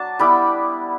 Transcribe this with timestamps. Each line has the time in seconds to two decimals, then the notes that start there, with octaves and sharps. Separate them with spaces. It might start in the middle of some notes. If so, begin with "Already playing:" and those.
Already playing: F#3 D4 A5
0.19 G3 B3 E4 B5 D6